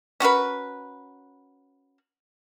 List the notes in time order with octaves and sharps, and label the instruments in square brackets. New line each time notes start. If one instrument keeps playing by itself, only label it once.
[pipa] C#4 F#4 A#4 B4